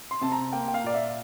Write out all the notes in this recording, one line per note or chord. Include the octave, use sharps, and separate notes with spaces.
C6
C3 A5
A#5
A#3 G5
G5
F5
A#2 D5
E5